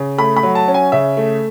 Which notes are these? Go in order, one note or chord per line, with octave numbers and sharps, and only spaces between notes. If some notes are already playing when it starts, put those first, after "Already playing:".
Already playing: C#3
A3 B5
B5
F#3
A5
C#4
G#5
C#3 E5
A3